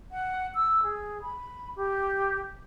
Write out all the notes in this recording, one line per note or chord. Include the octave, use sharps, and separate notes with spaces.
F#5
E6
G#4
B5
G4